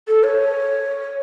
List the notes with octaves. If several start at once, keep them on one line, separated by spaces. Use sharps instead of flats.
A4
C#5